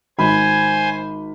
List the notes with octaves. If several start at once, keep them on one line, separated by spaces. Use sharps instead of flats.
G#1 C5 G#5 B5